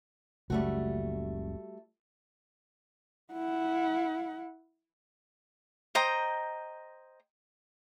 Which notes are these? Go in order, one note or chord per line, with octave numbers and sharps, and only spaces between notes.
F#1 C#2 G3 A3 F#4
E4 F#5
C5 D#5 G5 A#5